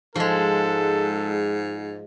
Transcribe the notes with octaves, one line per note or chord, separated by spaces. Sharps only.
G#2 F3 G#3 A4